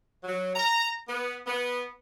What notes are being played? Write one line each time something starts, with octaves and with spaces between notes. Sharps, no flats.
F#3
A#5
B3
B3